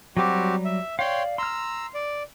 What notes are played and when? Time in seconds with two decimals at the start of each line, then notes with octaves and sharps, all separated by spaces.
0.17 F#3 G3 C4 F#4 G4 D6
0.65 E5
0.99 C#5 D5 F5 G5 C6
1.38 A#5 C6 E6 F6
1.94 D5